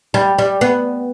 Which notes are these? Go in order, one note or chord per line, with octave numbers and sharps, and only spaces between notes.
G3
G3
B3